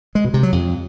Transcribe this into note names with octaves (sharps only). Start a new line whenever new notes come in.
G#3
B2
C3
F#3
F2